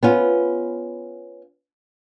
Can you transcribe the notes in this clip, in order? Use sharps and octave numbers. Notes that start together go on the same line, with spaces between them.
B3 C#4 F4